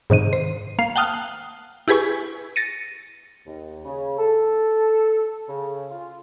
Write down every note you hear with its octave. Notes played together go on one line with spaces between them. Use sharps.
G#2 C3 D#3 D#7
C5
A#3 F5 C7
F#5 G5 A5 D#6 F6 F#6
E4 G4 G#4 B4 G#5 C#6
A6 A#6 C#7 D#7
D#2
C#3
A4
C#3
F4